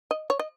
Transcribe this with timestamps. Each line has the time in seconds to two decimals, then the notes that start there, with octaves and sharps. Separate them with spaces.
0.11 D#5
0.30 C#5
0.39 D#5